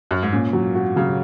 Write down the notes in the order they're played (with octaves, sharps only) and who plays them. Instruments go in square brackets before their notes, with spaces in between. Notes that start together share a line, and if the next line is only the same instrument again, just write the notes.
[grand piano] F#2
G#2
[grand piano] A#2 [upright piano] C#4
[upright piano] F#3
F#4
[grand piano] C#3 [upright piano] F#3